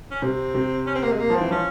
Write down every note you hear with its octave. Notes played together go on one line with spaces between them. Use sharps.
C#4
C3 C4
C3
C#4
C4
A#3
G#3
A#3
F3
C4
E3
F3 C#4